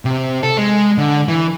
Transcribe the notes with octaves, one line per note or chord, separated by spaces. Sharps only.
C3
A4
G#3
D3
E3